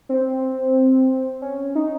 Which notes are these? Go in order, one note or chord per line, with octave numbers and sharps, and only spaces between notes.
C4
C#4
D#4